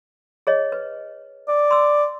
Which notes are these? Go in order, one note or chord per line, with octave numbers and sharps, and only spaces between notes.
G#4 C#5 D#5
B4
D5
C6 E6